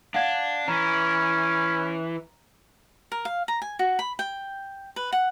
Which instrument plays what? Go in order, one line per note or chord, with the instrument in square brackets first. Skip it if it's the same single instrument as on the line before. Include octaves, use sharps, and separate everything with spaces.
[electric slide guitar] D4 [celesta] F5 F#5 G#6
[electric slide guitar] E3 [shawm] C#4 [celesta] A#5
[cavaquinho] A#4
F5
A#5
G#5
F#4
B5
G5
B4
F#5